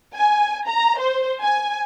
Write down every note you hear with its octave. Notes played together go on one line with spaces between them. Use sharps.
G#5
A#5
C5
G#5